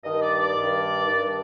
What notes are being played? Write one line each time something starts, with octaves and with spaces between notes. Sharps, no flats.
G2 D#3 D#5
D5
D5
G2 D#3
G2 D#3